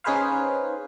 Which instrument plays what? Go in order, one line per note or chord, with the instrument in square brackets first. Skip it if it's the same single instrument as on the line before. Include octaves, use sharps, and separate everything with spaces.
[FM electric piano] C#4 D#4 G#4 B4 C5 F5